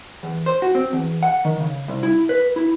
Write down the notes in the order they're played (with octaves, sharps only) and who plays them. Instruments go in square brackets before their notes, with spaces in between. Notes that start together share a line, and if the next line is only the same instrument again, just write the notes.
[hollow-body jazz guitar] E2
C5
F#4
C4
E2
F#5
D#3
C#3
C2
E4
B4
E4